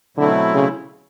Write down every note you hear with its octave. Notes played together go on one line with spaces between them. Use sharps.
B2 D3 F#3 A3 C4 E4
C#3